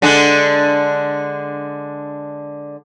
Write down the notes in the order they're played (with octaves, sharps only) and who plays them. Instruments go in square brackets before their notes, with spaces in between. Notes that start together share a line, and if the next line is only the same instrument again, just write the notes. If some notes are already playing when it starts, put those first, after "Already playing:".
[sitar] D3 G#3 D4